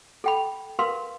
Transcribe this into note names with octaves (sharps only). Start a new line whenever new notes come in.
A4 G5 B5
A#4 B4 F5 C6